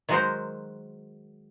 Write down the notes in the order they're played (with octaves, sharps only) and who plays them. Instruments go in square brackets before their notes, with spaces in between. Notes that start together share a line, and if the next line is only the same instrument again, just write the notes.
[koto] D#3 F#3 G#3 F#4 A#4 C5